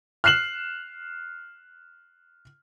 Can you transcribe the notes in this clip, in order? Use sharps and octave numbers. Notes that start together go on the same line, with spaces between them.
F6 F#6 C7 E7 F#7